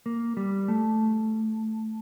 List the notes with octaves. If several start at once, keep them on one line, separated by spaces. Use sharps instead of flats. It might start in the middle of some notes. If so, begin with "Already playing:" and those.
A#3
G3
A3